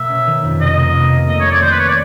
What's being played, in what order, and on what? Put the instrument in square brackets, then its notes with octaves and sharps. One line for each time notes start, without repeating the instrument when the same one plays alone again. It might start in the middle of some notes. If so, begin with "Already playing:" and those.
Already playing: [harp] B2 A#3 [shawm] E5
[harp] C#4
D#3
F2
[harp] C3 [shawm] D#5
[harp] A#3
A#3
A#3
[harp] A3 [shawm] D#5
[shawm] C#5
[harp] A3
[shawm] D5
[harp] D#3 [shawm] C5
[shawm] B4
C#5
D5